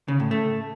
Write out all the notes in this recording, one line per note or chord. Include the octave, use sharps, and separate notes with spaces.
C#3
A2
A3